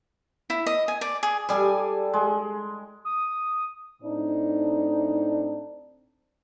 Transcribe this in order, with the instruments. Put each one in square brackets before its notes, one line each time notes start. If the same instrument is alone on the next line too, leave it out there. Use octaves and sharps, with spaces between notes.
[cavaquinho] E4
D#5
G#5
D5
G#4
[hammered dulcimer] G3 A4 [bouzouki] G#4 D5 G#5
[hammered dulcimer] G#3
[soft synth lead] D#6
[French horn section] A2 C4 D4 D#4